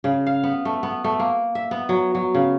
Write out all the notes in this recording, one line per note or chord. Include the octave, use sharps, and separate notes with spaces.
C#3
F5
B3
A3
B3
A3
A#3
E5
B3
F#3
F#3
C#3